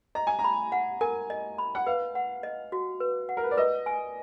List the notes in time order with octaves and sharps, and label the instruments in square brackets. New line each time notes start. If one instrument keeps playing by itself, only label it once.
[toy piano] D#5 [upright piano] A#5
[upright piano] G#5
A#5
[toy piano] B5
F#5
[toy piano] A#4 [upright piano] G#5
[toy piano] D#5
B5
[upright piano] F#5
[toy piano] B4 [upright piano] F5
[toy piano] F#5
D#5
F#4
B4
F#5
[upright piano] A#4
B4
D5
[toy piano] B4 [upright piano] D#5
[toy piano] G#5